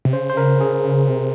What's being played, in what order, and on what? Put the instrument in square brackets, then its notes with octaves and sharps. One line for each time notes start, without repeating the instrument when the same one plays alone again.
[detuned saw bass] C3
[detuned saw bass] C#3 [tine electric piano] C5
[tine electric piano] C5
A#4
G#4
[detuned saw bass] C3